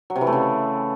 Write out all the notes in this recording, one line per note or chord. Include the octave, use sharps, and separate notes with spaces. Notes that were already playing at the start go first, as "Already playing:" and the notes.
F#3
C3
E3
A3
C#3